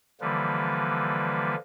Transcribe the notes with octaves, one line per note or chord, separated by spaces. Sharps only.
D3 E3 F3 G3 A#3 B4